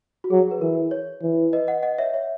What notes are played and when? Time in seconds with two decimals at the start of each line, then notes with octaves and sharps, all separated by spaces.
0.24 F#4
0.30 F#3 G#4
0.51 B4
0.61 E3 A#4
0.91 C#5
1.22 E3
1.53 B4 D#5
1.68 D#5 F#5
1.83 D#5 F#5
1.98 C#5 E5
2.14 C#5 E5